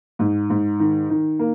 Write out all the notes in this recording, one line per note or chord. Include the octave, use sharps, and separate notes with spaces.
G#2
G#2
D#3
D#3
A#3